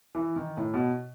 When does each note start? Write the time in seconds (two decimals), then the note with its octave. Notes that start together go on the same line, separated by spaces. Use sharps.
0.15 E3
0.36 D#3
0.57 A2
0.74 B2